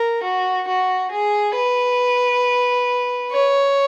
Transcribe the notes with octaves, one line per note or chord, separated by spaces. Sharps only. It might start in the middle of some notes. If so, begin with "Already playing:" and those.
Already playing: A#4
F#4
F#4
G#4
B4
C#5